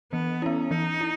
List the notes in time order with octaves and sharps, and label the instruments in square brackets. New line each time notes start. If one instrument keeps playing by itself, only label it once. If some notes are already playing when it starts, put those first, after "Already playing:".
[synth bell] E3 [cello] B3
[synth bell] B3 E4 [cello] C#4
[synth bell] E3 [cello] D#4
[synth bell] E4